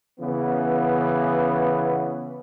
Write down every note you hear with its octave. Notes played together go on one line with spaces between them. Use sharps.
C#3 E3 B3